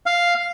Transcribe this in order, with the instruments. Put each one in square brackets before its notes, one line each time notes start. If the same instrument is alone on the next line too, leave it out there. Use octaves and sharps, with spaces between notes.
[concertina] F5